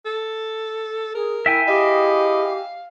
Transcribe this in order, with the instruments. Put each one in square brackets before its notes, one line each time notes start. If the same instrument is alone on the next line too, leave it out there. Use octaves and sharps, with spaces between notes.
[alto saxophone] A4
[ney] G#4 [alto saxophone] A#4
[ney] E4 [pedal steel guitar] E5 G5 G#5
[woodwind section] E4 G#4 D#5 [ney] G4 [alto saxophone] F5